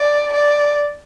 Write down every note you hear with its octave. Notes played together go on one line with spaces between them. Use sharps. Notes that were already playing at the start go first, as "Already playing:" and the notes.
Already playing: D5
D5